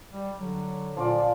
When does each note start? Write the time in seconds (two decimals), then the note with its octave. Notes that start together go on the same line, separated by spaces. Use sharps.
0.12 G3
0.37 D3 F#3
0.96 A#2 F3 F4 D5